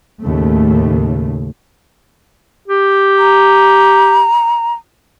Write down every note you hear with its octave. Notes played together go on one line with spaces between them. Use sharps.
D#2 A2 C#3 A3
G4
A#5